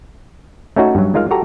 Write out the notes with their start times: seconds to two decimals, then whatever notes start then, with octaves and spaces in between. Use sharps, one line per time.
0.76 A3 C#4 D#4 F#4
0.95 G2 F#3
1.14 G#3 D#4 F4 A#4 F5
1.31 F#4 G4 A4 A#5